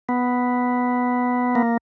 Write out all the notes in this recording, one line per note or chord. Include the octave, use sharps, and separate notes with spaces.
B3
A#3